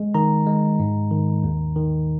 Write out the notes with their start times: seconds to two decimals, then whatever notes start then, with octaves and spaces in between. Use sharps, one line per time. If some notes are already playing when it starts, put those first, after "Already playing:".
Already playing: G#3
0.14 D#3 A#5
0.47 G#3
0.79 G#2
1.11 D#3
1.44 D#2
1.76 D#3